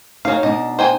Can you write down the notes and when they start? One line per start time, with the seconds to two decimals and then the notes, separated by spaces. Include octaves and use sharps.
0.25 F#3 D#4 C#5 F5 G#5
0.43 B2 D4 D#4 D#5
0.79 C5 G5 G#5